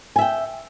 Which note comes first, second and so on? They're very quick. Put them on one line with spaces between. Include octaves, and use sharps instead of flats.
G#5 E5 G5